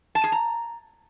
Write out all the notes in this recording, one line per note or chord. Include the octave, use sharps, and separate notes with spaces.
A5
G#4
A#5